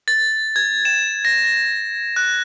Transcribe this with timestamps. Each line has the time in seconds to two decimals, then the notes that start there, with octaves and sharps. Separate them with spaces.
0.08 A6
0.56 G#6
0.85 E7
1.25 A#6
1.45 A#6
2.16 F#6